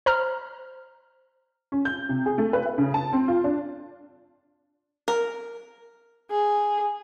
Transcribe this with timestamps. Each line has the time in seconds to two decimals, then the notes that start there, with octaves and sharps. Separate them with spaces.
0.06 C5 A#5 F6
1.72 C#4
1.85 G6
2.09 C3
2.26 G#4
2.38 A3
2.53 B4
2.66 E5
2.78 C#3
2.94 A5
3.13 C4
3.28 F4
3.44 D4
5.08 A#4
6.30 G#4